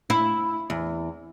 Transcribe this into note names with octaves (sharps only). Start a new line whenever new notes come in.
E4
E2